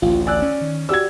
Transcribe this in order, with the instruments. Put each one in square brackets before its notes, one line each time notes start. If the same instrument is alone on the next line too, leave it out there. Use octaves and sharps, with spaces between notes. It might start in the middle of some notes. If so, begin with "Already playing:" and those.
[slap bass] A1 D2 [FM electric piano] F4
[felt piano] D5 [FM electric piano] G#5 E6 F#6
[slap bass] C#4
[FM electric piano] D#3
[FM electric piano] F#4 G4 D5 [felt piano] E6 G#6